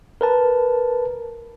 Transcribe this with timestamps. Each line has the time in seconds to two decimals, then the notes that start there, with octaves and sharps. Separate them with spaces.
0.21 A#4 B4 A5